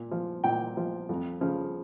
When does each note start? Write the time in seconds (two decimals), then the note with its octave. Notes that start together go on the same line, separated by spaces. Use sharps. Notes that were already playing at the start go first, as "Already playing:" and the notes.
Already playing: A#2
0.11 F3
0.44 A#2 G5
0.77 F3
1.09 F2
1.41 C#3 F3